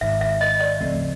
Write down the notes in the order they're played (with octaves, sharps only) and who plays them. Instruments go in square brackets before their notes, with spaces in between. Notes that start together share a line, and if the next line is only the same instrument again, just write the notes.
[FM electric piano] G#1 G#2 D#3 [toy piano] E5
[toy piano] E5
D#5
D5
[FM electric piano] D2 C#3 F3 A3 C4